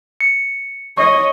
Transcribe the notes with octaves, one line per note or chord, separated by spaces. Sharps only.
C#7
C#5 D#5 C#6